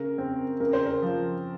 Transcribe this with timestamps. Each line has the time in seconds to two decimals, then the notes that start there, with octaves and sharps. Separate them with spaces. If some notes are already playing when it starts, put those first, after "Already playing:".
Already playing: C#3 A#4
0.18 C4
0.60 C#3 A#4
0.73 C5
0.86 A#4
1.02 F3